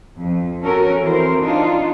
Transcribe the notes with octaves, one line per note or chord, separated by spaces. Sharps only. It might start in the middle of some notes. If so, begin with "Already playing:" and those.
F2
C#4 F#4 A4 A#4
E3 C4 A#4 C5
D4 D#4 F4